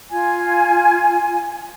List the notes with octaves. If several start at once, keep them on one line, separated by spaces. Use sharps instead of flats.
F4 G#5